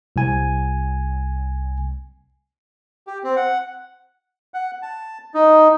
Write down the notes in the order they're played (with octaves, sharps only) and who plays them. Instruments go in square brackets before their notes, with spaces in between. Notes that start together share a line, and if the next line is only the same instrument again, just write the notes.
[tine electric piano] C2 G#5
[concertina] G4
C4
F#5
F#5
A5
D#4